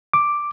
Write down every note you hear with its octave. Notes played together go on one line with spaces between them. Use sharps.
D6